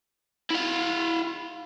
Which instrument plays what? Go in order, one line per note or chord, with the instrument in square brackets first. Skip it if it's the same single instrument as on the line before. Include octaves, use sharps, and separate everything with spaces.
[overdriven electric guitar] E4 F5